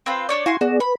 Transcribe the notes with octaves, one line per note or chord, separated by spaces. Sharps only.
C4 F4 B4 G6
D4 C#5 D5
E4 F#4 F5 G#5 C6 G#6
B3 F#4 G#4 D5
B4 B5